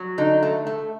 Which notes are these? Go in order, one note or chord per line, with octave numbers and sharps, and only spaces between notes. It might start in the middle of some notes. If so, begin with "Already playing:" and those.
Already playing: F#3
D3 D#4
A3
A3